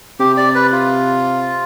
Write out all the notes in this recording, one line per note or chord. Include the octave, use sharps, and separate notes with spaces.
C3 G4
D5
B4
F4